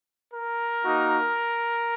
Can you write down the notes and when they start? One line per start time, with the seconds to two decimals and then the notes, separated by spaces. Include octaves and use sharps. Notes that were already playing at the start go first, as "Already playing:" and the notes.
0.32 A#4
0.84 A#3 D#4 F#4